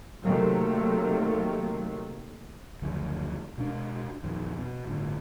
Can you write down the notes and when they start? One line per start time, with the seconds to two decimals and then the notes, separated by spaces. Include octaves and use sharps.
0.23 C3 D#3 F#3 A3 A#3
2.82 F#1 D2 F3
3.58 B2 G#3 D4
4.23 A#1 F2 D#3
4.57 B2
4.85 G1 A2 D3